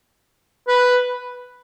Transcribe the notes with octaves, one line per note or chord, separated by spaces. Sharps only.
B4